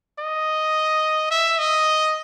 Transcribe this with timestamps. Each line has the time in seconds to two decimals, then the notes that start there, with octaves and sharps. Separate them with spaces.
0.19 D#5
1.31 E5
1.59 D#5